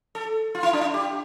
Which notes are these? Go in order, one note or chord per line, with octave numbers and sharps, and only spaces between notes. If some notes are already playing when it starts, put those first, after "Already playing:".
A4
F4
E4
D4
E4
G4